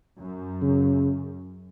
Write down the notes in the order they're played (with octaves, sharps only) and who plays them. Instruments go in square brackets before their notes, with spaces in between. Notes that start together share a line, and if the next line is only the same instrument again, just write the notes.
[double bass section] F#2
[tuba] C#3